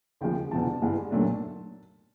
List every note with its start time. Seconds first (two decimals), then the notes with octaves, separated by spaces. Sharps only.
0.21 D#2 C#3 F3 G#3 G5
0.51 E1 E2 C3 F3 A5
0.82 G2 E3 G#3
1.11 B1 A#2 F#3 A3 D4